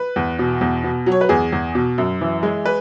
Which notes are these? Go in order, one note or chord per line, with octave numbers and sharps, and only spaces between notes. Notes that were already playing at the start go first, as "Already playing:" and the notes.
Already playing: B4
E2
B2
E2
B2
F#3
C#5
B4
E2 G#4
E2
B2
F#2
E3
G#3
B4